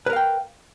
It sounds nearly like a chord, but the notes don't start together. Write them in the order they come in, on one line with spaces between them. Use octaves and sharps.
B4 A#4 F5 G5